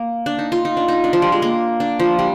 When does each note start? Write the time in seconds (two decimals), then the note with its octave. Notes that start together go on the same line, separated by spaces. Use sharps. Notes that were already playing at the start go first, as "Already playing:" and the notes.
Already playing: A#3
0.26 D4
0.39 D#4
0.52 F4
0.65 D#4
0.77 D4
0.88 D#4
1.04 D4
1.13 F3
1.22 G3
1.32 G#3
1.42 A#3
1.80 D4
1.99 F3
2.19 G3